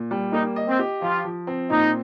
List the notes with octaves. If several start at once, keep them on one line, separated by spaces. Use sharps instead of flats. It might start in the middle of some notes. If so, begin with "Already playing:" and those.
Already playing: A#2
G3
A#3 D#4
D#5
C4
G4
F3 F4
F3
C4
A#2 D#4